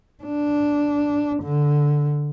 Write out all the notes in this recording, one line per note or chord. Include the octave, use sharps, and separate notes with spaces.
D4
D3